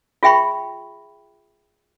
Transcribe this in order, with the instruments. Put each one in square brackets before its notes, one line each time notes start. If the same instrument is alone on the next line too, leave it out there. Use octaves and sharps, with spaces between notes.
[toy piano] F4 G#4 E5 G5 B5 C#6